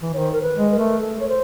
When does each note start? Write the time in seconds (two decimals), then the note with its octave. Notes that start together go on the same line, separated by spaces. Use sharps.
0.02 E3
0.13 D#3 C#5
0.18 C5
0.32 A#4
0.42 B4
0.56 G#3
0.71 B4
0.75 A3 A#4
1.00 A4
1.20 C#5
1.29 C5